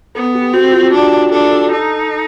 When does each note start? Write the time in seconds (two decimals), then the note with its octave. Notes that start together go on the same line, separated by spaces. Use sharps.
0.15 B3 A4
0.35 G4
0.53 C4 F#4
0.73 F4
0.92 D4 G4
1.31 D4 A4
1.51 A4
1.71 D#4 A4